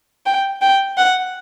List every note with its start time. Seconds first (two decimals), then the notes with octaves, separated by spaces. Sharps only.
0.26 G5
0.62 G5
0.98 F#5